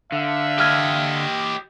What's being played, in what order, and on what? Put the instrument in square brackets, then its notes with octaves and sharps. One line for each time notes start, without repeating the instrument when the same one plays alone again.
[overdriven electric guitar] D3 [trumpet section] E5 F5
[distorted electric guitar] G4 D#5 [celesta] E6 F6 G#6